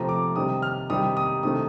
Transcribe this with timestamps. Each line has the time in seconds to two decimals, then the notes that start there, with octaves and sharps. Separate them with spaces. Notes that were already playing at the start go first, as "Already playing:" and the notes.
Already playing: C3 F3 A3 A#5
0.09 D6
0.36 C3 D#3 G3 D#6
0.62 F6
0.90 C3 D#3 G3 D#6
1.17 D#6
1.43 C3 D#3 A3 D#6